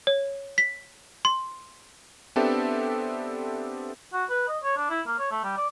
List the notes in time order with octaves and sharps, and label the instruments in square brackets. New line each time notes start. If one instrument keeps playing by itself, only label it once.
[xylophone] C#5
B6
C6
[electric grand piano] B3 C4 D4 G4 A4 E5
[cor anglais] F#4
B4
D#5
C#5
D4
E4
A#3
C#5
A3
G3
D5